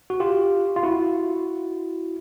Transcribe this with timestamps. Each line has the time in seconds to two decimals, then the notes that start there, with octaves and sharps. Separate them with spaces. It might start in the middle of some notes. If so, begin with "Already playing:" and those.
0.10 F#4
0.20 F4 G4
0.76 F4
0.83 E4 F#4